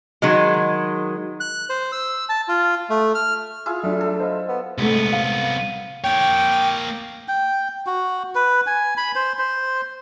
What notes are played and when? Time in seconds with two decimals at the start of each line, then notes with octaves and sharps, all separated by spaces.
0.22 D#3 F#3 G#3
1.40 F#6
1.69 C5
1.92 E6
2.29 A5
2.48 F4
2.90 A3
3.15 F6
3.66 E4 F4 G#4
3.83 F#3 A3 D4
4.01 A4
4.20 C5 D#5 F5
4.49 B3
4.78 C2 G#2 A3 B3
5.12 F5
6.04 A#3 C#5 G5
7.28 G5
7.87 F#4
8.35 B4
8.67 G#5
8.97 B5
9.15 C5
9.39 C5